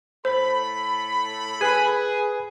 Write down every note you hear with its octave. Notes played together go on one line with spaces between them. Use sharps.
A2 A4 C5 B5
G#4 B4 G#5